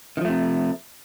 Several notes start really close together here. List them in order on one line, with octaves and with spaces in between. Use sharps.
D#3 F3 A3 C3